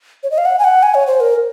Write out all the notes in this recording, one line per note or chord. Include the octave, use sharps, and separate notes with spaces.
C#5
D#5
F5
F#5
G#5
F#5
G#5
C#5
C5
A#4